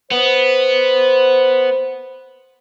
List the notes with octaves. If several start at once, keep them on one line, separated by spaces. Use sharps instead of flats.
B3 C5